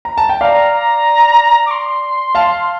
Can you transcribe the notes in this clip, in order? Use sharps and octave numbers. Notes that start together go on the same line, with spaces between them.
A#5
A5
G5
D5 F5 A#5
A#5
D6
C6
F5 A5